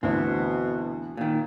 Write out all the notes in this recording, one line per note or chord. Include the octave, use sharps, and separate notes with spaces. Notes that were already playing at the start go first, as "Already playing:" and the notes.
D2 B2 E3 C4
A#2 D#3